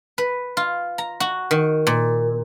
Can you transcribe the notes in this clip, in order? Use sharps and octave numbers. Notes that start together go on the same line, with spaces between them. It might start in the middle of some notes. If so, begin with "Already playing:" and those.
B4
F4
A#5
F#4
D#3
A#2